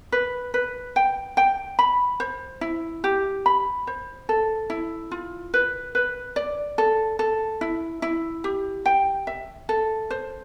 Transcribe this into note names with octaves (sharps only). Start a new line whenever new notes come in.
B4
B4
G5
G5
B5
C5
E4
G4
B5
C5
A4
E4
F4
B4
B4
D5
A4
A4
E4
E4
G4
G5
E5
A4
C5